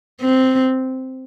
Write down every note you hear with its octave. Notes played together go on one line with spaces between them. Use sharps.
C4